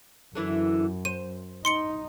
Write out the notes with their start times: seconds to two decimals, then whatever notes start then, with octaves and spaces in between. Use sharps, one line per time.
0.35 F#2 D3 E3 E4
1.05 C5 D#7
1.65 D#4 C6 C#7 G7